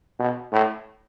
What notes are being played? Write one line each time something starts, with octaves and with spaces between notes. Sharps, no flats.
B2
A2